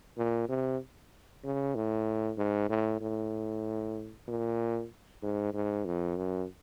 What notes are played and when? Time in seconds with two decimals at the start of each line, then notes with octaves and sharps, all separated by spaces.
0.17 A#2
0.49 C3
1.44 C#3
1.75 A2
2.38 G#2
2.69 A2
3.01 A2
4.28 A#2
5.22 G#2
5.53 G#2
5.85 F2
6.17 F#2